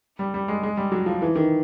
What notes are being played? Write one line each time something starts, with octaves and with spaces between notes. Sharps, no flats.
G3
G3
G#3
G#3
G3
F#3
F3
E3
D#3